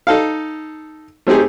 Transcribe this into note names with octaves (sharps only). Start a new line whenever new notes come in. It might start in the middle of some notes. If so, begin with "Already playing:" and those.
D#4 A4 F5
A3 C4 D#4 G4 G#4